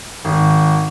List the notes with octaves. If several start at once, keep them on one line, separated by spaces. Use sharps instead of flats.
G#1